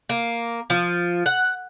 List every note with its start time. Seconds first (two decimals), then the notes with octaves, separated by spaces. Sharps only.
0.09 A#3
0.70 F3
1.26 F#5